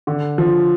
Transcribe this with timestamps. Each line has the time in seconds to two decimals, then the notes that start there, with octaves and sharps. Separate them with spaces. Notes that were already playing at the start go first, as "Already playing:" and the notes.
0.07 D3
0.38 F3